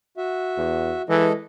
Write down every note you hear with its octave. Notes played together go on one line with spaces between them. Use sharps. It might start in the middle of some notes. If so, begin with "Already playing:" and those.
F#4 E5
E2
E3 G#3 A4 D#5